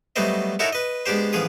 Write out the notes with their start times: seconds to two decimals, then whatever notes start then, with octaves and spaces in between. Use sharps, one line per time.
0.16 F#3 G3 A3 B3 C5 D#5
0.59 D#4 E4 F#4 A4 A#4 C#5
0.73 B4 D#5
1.06 G#3 B3 D4 G4 C5
1.33 A1 F3 B3 G#4 D#6